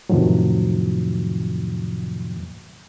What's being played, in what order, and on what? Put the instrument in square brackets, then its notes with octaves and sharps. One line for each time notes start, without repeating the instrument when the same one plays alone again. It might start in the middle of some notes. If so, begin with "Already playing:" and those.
[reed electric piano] F2 A2 C3 D#3 F3 F#3